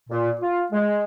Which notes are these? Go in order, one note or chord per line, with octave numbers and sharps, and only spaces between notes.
A#2
F4
G#3